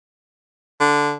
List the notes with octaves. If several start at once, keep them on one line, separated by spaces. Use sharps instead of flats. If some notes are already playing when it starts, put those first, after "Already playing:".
D3